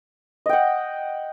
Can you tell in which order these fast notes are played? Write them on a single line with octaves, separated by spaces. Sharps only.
D#5 G5 F#5